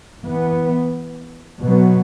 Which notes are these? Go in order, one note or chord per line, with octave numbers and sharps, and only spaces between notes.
E3 B3
B2 F#3 B3